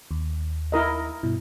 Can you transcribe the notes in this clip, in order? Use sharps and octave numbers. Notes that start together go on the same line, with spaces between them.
D#2
E4 A#4 D#5
G2 B2 E4